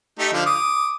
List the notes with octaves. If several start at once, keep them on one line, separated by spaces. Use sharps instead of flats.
A3 D#4 G4
D3 F3 F5
D6 D#6